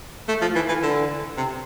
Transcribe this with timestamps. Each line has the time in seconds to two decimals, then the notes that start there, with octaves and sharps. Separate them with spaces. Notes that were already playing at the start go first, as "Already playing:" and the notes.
0.29 A3
0.42 F3
0.55 E3
0.69 E3
0.83 D3
1.37 C3